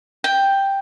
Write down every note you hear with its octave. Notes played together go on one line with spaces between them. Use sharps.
G5